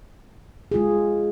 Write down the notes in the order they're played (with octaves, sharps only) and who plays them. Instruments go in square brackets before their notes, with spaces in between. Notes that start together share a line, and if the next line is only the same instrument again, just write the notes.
[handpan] G#3 F4 G#4